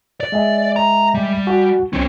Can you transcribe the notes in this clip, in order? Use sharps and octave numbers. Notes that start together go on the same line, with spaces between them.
D5
G#3 E5 G#5
A#5
G3
F#4 F#5 G#5
C2 D3 F#3 C4 C#4